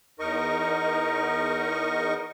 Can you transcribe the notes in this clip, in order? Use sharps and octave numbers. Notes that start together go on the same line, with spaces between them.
E2 D#4 A#4 D#5 C#6